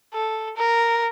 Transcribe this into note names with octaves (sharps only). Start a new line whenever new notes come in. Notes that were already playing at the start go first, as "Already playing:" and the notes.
A4
A#4